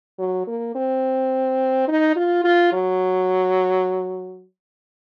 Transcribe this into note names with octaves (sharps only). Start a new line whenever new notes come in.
F#3
A#3
C4
D#4
F4
F4
F#3